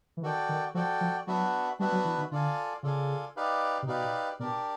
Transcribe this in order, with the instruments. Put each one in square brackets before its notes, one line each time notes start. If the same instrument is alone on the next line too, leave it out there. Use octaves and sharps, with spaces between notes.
[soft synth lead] E3
[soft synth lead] D#3 [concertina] F#4 A4 D5 G5
[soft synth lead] D#3
[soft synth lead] F3 [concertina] F#4 A4 D5 G5
[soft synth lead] F3
[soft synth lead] F#3 [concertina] B3 D4 F#4 B4 E5
[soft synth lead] G3 [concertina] B3 D4 F#4 B4 E5
[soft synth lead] F#3
E3
D#3
[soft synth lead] D3 [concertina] F4 A4 D5 F5 G#5
[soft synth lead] C#3 [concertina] F4 A4 D5 F5 G#5
[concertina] D#4 G4 B4 D5 F5
[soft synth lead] C3
[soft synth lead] B2 [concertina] D#4 G4 B4 D5 F5
[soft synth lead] B2 [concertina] D4 G4 A#4 D5